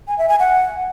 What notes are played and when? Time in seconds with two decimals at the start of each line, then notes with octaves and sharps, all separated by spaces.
0.08 G#5
0.18 E5
0.29 G#5
0.40 F#5